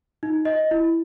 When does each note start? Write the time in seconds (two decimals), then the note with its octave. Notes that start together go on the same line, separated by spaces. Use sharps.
0.23 D#4
0.45 D#5
0.71 E4